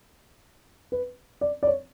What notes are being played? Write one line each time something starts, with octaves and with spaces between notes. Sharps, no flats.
B4
D5
D5
C#5